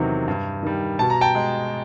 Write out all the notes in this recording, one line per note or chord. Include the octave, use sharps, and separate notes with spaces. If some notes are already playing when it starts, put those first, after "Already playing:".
Already playing: E2 C3 D#3 F#3
G2
D#3 G3
B2 A5
A#5
G5 A5
G#3